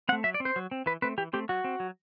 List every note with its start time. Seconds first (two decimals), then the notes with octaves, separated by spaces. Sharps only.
0.09 C4 F#5
0.12 A3
0.24 F#3 E5
0.34 D5
0.40 C4
0.45 C5
0.56 F#3
0.71 C4
0.86 E3 B4
1.02 A3 C4 B4
1.18 E3 G4
1.33 A3 C4 G4
1.49 F#3 F#4
1.64 C4
1.80 F#3